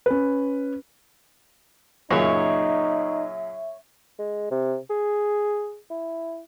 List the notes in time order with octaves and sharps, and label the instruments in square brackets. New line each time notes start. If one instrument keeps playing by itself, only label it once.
[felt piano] C#4 B4
[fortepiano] F#2 A#2 C#3 [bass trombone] D#4 [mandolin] C#5 [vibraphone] E5
[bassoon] G#3
C3
G#4
E4